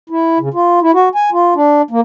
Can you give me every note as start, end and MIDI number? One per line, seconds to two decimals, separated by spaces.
0.10 0.38 64
0.40 0.49 49
0.54 0.80 65
0.82 0.91 64
0.94 1.09 66
1.15 1.30 80
1.32 1.54 65
1.55 1.82 62
1.91 2.01 58